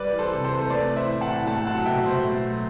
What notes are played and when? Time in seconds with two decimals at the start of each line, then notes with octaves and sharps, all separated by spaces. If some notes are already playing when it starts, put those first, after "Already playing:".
Already playing: G3 B4 D5
0.12 E3
0.18 A4 C5
0.32 C3
0.44 A4 C5
0.51 C3
0.61 C5
0.70 A3 B4 D5
0.89 E3
0.96 C5 E5
1.08 A2
1.21 F#5 A5
1.27 A2
1.47 A3 F#5 A5
1.67 F#3 F#5 A5
1.85 B2 E5 G5
2.04 B2 C5 E5
2.23 A3
2.43 F#3